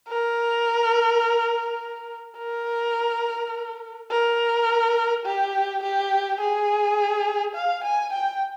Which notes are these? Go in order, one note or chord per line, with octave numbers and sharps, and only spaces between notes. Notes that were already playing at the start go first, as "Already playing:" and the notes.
A#4
A#4
A#4
G4
G4
G#4
F5
G#5
G5